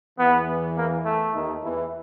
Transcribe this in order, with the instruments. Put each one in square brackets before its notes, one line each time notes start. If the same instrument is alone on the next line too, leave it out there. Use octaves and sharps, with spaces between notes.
[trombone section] E2 E3 [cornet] B3
[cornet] A#3
A3
[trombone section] D#2 D#3
E2 E3